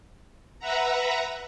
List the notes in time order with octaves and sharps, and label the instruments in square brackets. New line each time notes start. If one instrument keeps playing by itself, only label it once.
[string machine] B4 E5 F#5 A#5